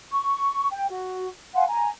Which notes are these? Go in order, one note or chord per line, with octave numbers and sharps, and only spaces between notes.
C#6
G5
F#4
F5 F#5 G#5 C6
G#5 A#5